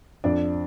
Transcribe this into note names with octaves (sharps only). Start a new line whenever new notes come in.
F2 D4 D5